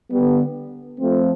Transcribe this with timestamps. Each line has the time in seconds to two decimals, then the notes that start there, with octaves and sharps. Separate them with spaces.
0.11 D3 G3 B3
0.99 F3 A3 C4